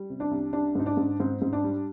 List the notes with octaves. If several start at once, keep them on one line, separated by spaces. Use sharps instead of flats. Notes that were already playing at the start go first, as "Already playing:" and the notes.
Already playing: G3
C3
D4
C2
G3 D4
G#2 D#4
D4
G#2
G#2 C4
G#2
D4
G3